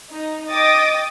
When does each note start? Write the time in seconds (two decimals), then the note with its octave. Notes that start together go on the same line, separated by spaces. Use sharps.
0.11 D#4
0.50 D#5 G5 D6 D#6 A6 A#6